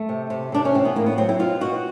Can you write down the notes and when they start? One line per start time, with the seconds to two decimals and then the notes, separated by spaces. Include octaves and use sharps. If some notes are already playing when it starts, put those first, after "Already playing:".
Already playing: A3
0.09 C3
0.30 C3
0.52 C3 D4
0.65 C#4
0.74 E3 C4
0.85 B3
0.96 A2 A#3
1.06 B3
1.17 F#3 C4
1.29 E4
1.39 B2 F4
1.61 B2 F#4